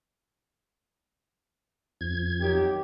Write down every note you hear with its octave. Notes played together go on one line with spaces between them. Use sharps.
F2 G#6
D#3 F#3 G4